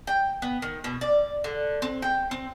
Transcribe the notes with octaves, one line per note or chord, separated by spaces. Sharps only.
G5
B3
D#3
B2
D5
D3
C4
G5
C4